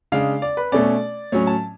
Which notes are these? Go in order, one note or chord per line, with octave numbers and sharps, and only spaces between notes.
C#3 G#3 D4 F5
D5
B4
B2 A3 C#4 D5
A2 F#3 C#4 C#5
A5